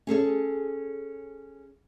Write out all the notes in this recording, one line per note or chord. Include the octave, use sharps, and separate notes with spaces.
C#4 G#4 A4 C#5